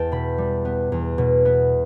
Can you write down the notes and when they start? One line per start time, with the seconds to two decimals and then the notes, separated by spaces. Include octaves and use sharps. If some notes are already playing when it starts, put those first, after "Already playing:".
Already playing: E2 G5 A5
0.12 B2 B5
0.38 G3
0.65 B3
0.92 E2
1.18 B2
1.45 B3